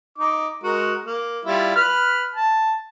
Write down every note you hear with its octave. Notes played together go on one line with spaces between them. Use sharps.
D#4 D6
G#3 F#4 A#4
A#3
G3 E4 F4
B4 B5 F6
A5